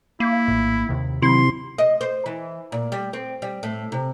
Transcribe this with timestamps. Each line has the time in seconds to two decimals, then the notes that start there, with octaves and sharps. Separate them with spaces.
0.20 A#3 E4
0.48 A#1 A2
0.89 D#2 C3 D#3
1.22 C3 D#3 F#3 E4 C6
1.78 D#5
2.01 C5
2.26 E3
2.72 A#2
2.92 G3
3.13 C4
3.42 G3
3.63 A2
3.92 C3